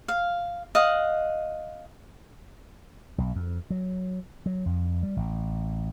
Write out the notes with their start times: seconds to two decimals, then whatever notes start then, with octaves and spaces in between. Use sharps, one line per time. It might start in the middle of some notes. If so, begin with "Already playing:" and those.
0.08 F5
0.75 D#5 F5 F#5
3.18 B1
3.36 F2
3.70 F#3
4.46 F#3
4.66 F2
5.03 G3
5.17 A1